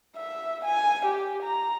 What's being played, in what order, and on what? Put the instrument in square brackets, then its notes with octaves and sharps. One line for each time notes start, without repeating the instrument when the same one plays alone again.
[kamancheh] E5
G#5
G4
A#5